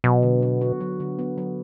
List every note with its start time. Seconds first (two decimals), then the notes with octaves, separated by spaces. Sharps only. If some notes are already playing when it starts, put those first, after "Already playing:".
0.04 B2 F#3
0.23 D3
0.42 B3
0.61 F#4
0.80 F#3
1.00 D3
1.19 B3
1.38 F#3